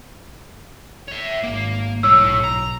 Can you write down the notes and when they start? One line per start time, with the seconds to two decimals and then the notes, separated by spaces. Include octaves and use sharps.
1.08 C#5 E5
1.43 G#1 A#3
2.03 B1 A2 C#5 E6
2.44 A#5